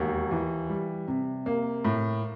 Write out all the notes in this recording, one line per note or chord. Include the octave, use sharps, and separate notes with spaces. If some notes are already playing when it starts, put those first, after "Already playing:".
Already playing: E1 D#2
E3
G3
C3
A#3
A2